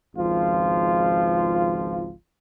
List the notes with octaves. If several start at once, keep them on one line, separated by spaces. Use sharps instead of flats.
G#1 C#2 F3 F4